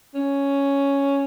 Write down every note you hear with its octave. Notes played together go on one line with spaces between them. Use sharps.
C#4